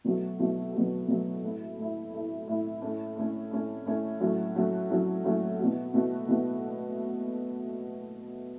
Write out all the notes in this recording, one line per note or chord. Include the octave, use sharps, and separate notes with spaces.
B2 F#3 A3 F#4
B2 F#3 A3 F#4
B2 F#3 A3 F#4
B2 F#3 A3 F#4
A2 A3 E4
A2 A3 E4
A2 A3 E4
A2 A3 E4
A2 A3 C#4
A2 A3 C#4
A2 A3 C#4
A2 A3 C#4
A2 F#3 A3 C#4 F#4
A2 F#3 A3 C#4 F#4
A2 F#3 A3 C#4 F#4
A2 F#3 A3 C#4 F#4
B2 A3 F#4
B2 A3 F#4
B2 A3 F#4